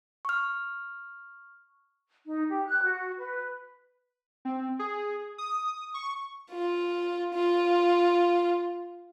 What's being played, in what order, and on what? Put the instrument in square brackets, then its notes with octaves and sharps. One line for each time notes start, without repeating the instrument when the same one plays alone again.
[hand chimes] C#6 F6
[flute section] D#4
G4
F#6
F#4
B4
[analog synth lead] C4
G#4
D#6
C#6
[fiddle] F4
F4